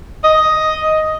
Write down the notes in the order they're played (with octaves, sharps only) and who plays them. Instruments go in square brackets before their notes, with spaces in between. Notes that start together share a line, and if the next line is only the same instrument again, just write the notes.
[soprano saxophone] D#5